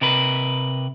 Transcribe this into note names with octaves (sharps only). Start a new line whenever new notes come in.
C3 A#4 B4